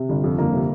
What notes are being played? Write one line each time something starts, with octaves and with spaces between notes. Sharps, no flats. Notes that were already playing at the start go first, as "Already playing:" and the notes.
Already playing: C3
G1
F2
G1 A#3
C3